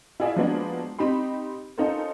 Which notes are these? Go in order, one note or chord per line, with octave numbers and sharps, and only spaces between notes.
E4 F4 G#4 D5 E5
F3 F#3 G#3 A#3 B3 D4
C4 D#4 G4 B5 C6
C#4 D#4 F4 A4 A#4 C5